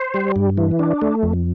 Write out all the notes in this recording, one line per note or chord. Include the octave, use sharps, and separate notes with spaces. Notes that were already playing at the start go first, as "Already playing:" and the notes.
Already playing: C5
G3
G2
E3
D4
A3
F2